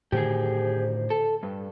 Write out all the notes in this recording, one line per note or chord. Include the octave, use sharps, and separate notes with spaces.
A2 D3 D#3 G4 G#4 C5
A4
G2